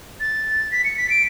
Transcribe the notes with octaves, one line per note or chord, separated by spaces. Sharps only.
A6
B6
C#7
B6
D7